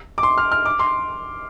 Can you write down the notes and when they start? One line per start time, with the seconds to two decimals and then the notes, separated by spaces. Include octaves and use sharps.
0.18 D6
0.23 C6
0.38 F6
0.52 F6
0.66 D6
0.79 C6